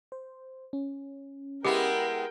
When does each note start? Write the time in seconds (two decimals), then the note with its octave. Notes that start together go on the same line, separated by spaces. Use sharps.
0.12 C5
0.73 C#4
1.65 G#3 B3 E4 G4 A#4 G5